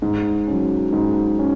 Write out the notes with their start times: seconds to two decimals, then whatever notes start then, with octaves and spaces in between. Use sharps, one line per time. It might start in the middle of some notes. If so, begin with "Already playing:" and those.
0.02 G#2
0.47 F#3 C#4
0.93 G#2
1.39 C#4